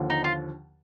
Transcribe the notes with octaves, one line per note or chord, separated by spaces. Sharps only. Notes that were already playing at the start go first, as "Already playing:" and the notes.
Already playing: D#2 D3 F3
D#4
F4